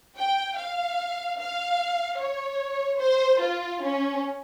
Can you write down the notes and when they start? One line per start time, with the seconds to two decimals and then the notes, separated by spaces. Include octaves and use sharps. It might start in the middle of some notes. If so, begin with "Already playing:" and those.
0.18 G5
0.58 F5
1.39 F5
2.19 C#5
2.99 C5
3.40 F4
3.81 C#4